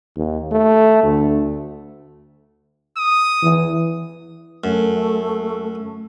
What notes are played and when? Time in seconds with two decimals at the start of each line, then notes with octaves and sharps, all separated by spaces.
0.17 D#2
0.51 A3
1.03 D2
2.97 D#6
3.42 E3
4.64 F#2 A3